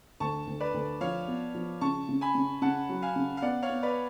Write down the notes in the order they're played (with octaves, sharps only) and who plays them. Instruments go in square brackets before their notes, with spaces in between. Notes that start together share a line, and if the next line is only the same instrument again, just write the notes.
[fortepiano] D2 [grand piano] A5 C#6
[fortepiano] D2
[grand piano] B4 D5
[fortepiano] D2
[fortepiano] F3 [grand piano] C#5 F5
[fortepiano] B3
F3
[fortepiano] C#3 [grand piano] A5 C#6
[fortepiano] C#3
[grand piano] G#5 B5
[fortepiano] C#3
[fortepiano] C#3 [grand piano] F#5 A5
[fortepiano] F#3
[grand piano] F5 G#5
[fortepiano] C#3
[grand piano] F5
[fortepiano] B3 [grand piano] D5 F#5
[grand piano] C#5 F5
[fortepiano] B3
[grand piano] B4 D5